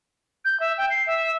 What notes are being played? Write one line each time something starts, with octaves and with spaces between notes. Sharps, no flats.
G6
E5
G5
C7
E5